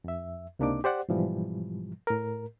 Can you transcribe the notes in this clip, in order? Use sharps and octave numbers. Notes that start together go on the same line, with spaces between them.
F2 E5
C#2 C3 A#3 D4 D#4 D6
G4 C5 D5 F#5
G#2 B2 E3 F3 G3
A2 A#4